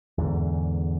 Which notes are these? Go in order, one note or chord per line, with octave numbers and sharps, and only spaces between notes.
E2 G#2 D3